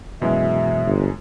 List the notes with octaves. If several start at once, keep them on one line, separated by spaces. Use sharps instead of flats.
F#2 B2 E3 G#3 E5
G1